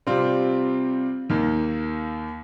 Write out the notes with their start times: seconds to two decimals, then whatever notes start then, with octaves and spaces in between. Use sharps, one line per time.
0.07 C3 G3 C4 F4
1.30 D#2 D#3 A#3